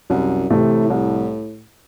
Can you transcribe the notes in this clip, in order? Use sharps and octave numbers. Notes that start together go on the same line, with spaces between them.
C2 F#2
A2 C3 E3 A3
C2